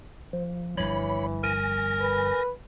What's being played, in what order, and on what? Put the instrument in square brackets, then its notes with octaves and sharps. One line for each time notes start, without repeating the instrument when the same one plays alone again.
[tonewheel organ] F3
[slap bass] G1 G2 F3 [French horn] E3 [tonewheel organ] C#5 B5
[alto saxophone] A#4 [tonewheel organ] G#5 A#6
[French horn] B4